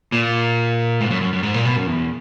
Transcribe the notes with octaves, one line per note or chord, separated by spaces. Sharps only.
A#2
G#2
F#2
F#2
F#2
G#2
A#2
B2
F#2
E2